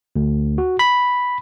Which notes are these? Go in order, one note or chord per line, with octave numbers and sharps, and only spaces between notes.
D2
F#4
B5